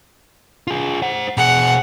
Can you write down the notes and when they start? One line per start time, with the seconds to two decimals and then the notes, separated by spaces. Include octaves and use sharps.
0.67 F4 G#4
1.02 C5 F#5
1.37 B2 G#4 F#5